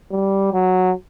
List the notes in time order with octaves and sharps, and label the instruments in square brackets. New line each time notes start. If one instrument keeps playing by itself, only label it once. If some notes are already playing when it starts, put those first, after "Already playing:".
[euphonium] G3
F#3